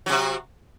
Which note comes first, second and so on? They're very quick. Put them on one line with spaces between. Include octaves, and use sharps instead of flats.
F#3 C3 F#4